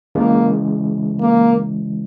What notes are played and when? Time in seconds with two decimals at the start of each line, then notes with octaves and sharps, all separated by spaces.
0.15 C#3 E3 G#3 A#3
1.20 A#3